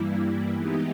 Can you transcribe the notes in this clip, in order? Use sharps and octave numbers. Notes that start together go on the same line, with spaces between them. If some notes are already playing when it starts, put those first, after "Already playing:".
Already playing: G2 E3 G3 A#3 E4
E3 G#3 B3 D#4 G4